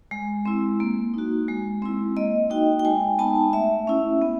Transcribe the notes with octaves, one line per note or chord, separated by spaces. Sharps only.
G#3
C4 E4
A#3
D#4 F#4
G#3
C4 E4
A#3 D#5
D#4 F#4 G5
G5
G#3 G#5
B3 D#4 A5
A3 E5
C#4 E4
B3